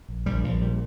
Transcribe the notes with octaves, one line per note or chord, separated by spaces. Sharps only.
A#1
A#1 G3
A#1 F3
A#2 G3